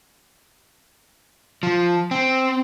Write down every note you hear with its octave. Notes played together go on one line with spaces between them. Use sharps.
F3
C4